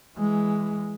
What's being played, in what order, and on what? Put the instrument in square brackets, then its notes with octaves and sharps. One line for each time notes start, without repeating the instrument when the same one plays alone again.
[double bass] E3 G#3